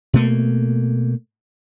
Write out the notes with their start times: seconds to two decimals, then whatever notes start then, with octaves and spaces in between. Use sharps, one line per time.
0.13 B2 A3 A#3